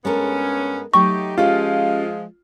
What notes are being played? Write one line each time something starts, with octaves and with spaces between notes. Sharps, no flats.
G2 G#3 B3 C#4 A4 A#4
F#3 A3 D#4 G4 G5 C#6
F3 G#3 C#4 F4 G4